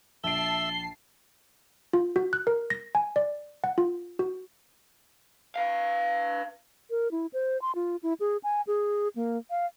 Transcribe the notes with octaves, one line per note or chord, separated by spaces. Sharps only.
A#1 E5 A5 C7 D7 G7
F4
F#4
F#6
A#4
A#6
G#5
D5
F#5
F4
F#4
B4 F5
A#4
E4
C5
C6
F4
E4
G#4
G#5
G#4
A#3
F5